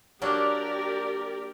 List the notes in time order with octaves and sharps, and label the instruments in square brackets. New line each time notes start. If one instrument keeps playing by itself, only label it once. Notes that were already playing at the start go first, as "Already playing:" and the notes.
[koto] F#3 A#3 D4 [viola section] G4 A#4 D5